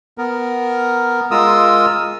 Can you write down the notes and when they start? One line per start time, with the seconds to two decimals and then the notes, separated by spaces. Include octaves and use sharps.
0.18 B3 A#4
1.31 G#3 F4 A#4 D#6 E6